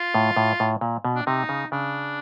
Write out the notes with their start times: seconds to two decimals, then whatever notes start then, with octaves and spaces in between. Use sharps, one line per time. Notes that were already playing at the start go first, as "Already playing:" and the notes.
Already playing: F4
0.15 A2
0.37 A2
0.60 A2
0.81 A#2
1.05 B2
1.15 D4
1.26 C3 D#4
1.49 C#3
1.72 C#3 D4